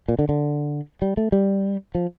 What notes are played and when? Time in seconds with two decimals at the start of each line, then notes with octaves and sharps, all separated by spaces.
0.08 A#2
0.19 D3
0.29 D3
1.02 G3
1.17 A3
1.32 G3
1.95 F3